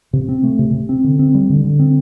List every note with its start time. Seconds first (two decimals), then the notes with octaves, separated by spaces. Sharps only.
0.13 C3
0.29 C4
0.43 A3
0.59 C3
0.74 C3
0.89 C4
1.04 D3
1.19 C4
1.34 G3
1.50 D3
1.64 D3
1.79 C4